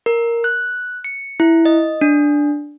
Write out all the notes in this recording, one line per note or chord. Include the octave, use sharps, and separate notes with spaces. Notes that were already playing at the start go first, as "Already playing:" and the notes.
A#4
F#6
C#7
E4
D#5
D4